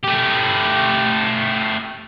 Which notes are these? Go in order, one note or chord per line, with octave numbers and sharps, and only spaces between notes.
A3 G4